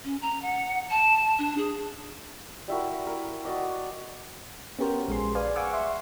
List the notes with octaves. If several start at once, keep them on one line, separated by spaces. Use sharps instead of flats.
C#4
A#5
F#5
A5
D4
G#4
G3 E4 F#4 A#4
E4 A#4
F#4 D5 D#5 D6
B3 C#4 F#4 G4 A#4 C5
A#1 G#3 G#4 C6
B4 D5 F5 G#5
F5 F#5 G#5 C#6 D6 E6
E5 C6